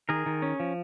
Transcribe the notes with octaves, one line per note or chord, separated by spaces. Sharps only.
D#3 G#4 A#4
D#3
C#4
F3